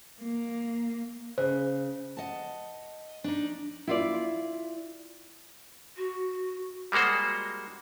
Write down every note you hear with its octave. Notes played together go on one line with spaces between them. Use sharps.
A#3
C#3 C5
D#5 F#5 A5
D4 D#4
E4 F4 D5
F#4
G3 G#3 A#3 F#4 C5